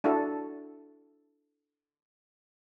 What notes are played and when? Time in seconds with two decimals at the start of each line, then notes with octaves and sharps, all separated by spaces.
0.04 D4 E4 F#4 A4